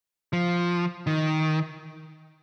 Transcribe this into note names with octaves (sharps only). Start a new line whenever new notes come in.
F3
D#3